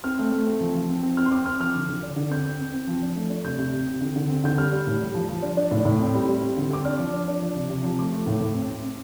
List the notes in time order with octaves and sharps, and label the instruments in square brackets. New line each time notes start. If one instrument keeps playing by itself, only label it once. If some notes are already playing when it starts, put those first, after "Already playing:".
[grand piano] C4 F6
A3
A3
C4
F3
F3
C4
C4
C4 F6
C6
C4 D6
C4 F6
F3 F6
D3
D3
D4
D3
C4 G6
C4
C4
C4
F3
D4
A3
D4
C3 G6
C3
C3
C4
D3
D3
C4
D3 G6
G3 F6
G3
A2
G3
F3
F3
D4
D4
A2
A2
C4
G3
G3
C4
D3
C4 D6
D4 F6
F3
D4
D4
F3
C3
C3
F3
A3 D6
A3
A2
A2
C4
C4
C4